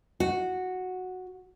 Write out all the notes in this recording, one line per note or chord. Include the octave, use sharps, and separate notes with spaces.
F#4